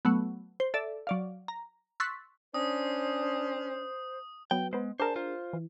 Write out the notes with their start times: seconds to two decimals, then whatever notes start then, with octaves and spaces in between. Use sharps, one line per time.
0.05 F#3 A3 B3
0.60 C5
0.74 A4 D5 E5
1.07 F#3 D5 F5
1.48 A#5
2.00 C6 C#6 E6 F#6 A6 B6
2.54 C#4 D4 C5 D#6
4.51 F#3 B3 G5
4.73 G#3 B3 C5
5.00 D4 G#4 A#4 C5 A5
5.16 F4 C5
5.53 E3